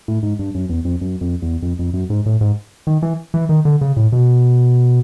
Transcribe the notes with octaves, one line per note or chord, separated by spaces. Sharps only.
A2
G#2
G2
F#2
E2
F2
F#2
F2
E2
F2
F2
F#2
G#2
A2
G#2
D#3
E3
E3
D#3
D3
C#3
A2
B2